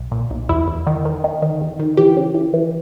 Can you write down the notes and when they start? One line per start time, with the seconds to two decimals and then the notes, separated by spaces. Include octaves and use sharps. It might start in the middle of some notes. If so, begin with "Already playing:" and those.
Already playing: B1
0.12 A#2
0.31 B1
0.49 E2 E4
0.68 E2
0.87 D#3
1.05 D#3
1.24 D#3
1.42 D#3
1.61 E2
1.79 D#3
1.97 E3 G4
2.17 C#3
2.34 E3
2.54 E3